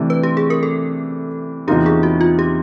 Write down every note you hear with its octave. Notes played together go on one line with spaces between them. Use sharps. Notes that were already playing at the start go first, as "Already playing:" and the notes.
Already playing: C3 E3 A3 D4
B4
G4
G#4
A#4
A4
E2 C3 F3 A#3 D#4 G4
G#4
F#4
F4
G4